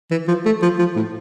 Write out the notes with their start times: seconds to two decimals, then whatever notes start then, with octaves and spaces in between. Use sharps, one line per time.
0.11 E3
0.28 F3
0.45 A3
0.62 F3
0.79 F3
0.96 A2